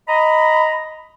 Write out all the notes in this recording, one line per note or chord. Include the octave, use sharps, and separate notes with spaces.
D#5 A#5 B5